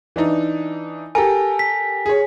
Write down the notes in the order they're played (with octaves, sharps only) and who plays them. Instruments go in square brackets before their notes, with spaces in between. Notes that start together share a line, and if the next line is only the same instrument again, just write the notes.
[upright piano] E3 D4 D#4
[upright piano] G4 A4 A#4 [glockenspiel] G#5
[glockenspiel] B6
[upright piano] G#4 C#5